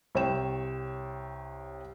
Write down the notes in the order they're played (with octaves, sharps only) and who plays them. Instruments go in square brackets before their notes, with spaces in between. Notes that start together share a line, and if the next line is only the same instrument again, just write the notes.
[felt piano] C2 C#5 G5 E7